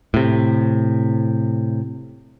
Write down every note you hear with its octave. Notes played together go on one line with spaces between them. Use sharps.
A2 C3